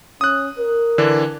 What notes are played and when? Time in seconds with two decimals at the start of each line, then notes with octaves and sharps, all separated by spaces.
0.21 C#4 D#6 F#6
0.59 A#4
0.98 D3 E3 D4